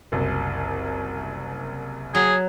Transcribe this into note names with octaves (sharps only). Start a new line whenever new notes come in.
F#1 C2
F#3 G#4